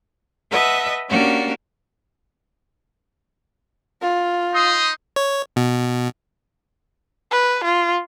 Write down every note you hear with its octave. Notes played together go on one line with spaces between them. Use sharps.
B4 D#5 E5 F#5 A5
A#3 C#4 D4 F#4 G4
F4
D#4 C6 D#6
C#5
B2
B4
F4